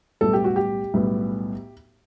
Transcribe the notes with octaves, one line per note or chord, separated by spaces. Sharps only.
B1 A2 G3 B3 A4
G4
F#4
G4
B1 A2 G3 B3